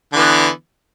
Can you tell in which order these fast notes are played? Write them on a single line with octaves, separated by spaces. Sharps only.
D3 E3 B3